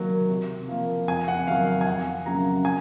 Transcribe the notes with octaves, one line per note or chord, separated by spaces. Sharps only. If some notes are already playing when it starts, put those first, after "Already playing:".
Already playing: C3 D#3 F#3 A#3
C3
F3 A#3
F2 G#5
F#5
D#3 F#3 F5
F5
G#5
F2 F#5
C#3 F#3 A#3 A#5
G#5